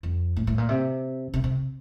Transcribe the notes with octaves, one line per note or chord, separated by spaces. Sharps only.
F2
A2
A2
A#2
C3
C3
C3